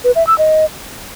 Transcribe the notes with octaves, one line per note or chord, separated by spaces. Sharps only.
B4
E5
E6
D#5